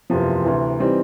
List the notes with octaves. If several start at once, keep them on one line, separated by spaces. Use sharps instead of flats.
F#1 E2 C3 F3
D2 C3 E3
E3 G3 C4 D#4